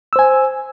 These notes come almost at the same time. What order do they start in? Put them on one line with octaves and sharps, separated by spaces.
E6 C5 G#5